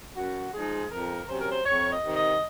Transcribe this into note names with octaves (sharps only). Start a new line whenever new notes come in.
F#2 F#4
F3 G#3 D#4 G#4
F2 A#4
C3 F#3 C#4 C5
A#4
C5
F2 C#5
D#5
C3 D#3
D#5